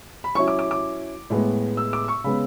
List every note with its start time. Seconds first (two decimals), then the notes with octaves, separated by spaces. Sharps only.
0.24 B5
0.35 F#3 C#4 E4 C#6
0.48 D6
0.59 D6
0.71 D6
1.30 A2 G#3 B3
1.77 E6
1.93 D6
2.08 C#6
2.24 C#3 G#3 B3 B5